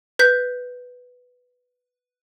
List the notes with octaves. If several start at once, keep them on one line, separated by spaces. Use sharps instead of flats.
B4 G6 B6